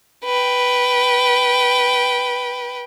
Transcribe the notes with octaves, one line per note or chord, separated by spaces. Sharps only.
B4 G5